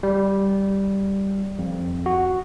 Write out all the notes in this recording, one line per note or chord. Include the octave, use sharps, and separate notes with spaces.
G3
F2
F#4